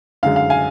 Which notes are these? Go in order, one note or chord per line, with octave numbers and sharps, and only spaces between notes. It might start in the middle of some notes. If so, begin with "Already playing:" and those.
F#2 D3 G#3 F5
F5
F5 G#5